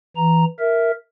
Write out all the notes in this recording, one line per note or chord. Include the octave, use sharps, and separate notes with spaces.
E3 A#5
A#4 E5